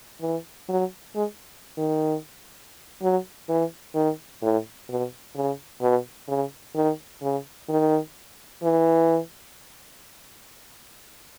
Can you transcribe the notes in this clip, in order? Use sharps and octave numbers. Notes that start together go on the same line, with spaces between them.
E3
F#3
G#3
D#3
F#3
E3
D#3
A2
B2
C#3
B2
C#3
D#3
C#3
D#3
E3